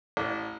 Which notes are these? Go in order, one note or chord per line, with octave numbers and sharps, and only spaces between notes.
A1